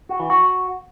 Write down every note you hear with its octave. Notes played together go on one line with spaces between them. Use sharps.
F#4
E3
F#4